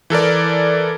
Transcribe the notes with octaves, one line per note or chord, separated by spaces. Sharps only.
E3 A4 A#4 D5